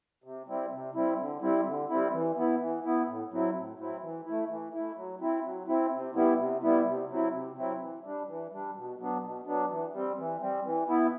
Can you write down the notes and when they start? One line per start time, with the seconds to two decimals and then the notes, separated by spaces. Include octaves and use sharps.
0.24 C3
0.48 G3 C4 E4
0.71 C3
0.95 G3 C4 E4
1.18 D3
1.42 G3 C4 E4
1.66 D3
1.89 G3 C4 E4
2.13 E3
2.37 B3 E4
2.61 E3
2.84 B3 E4
3.07 A2
3.32 F#3 C4 E4
3.55 A2
3.78 F#3 C4 E4
4.02 E3
4.26 A3 E4
4.50 E3
4.74 A3 E4
4.96 F#3
5.20 C4 E4
5.44 F#3
5.68 C4 E4
5.92 C3
6.15 G3 B3 E4
6.39 C3
6.63 G3 B3 E4
6.86 C3
7.10 F#3 C4 E4
7.33 C3
7.57 F#3 C4 E4
7.81 E3
8.04 G3 D4
8.28 E3
8.52 G3 D4
8.76 B2
8.99 F#3 B3 D4
9.22 B2
9.46 F#3 B3 D4
9.70 E3
9.93 G3 C4
10.18 E3
10.41 G3 C4
10.65 E3
10.89 B3 E4